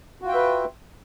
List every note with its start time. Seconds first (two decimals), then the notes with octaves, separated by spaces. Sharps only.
0.22 F#4
0.25 F4
0.28 G5
0.31 E5
0.35 B4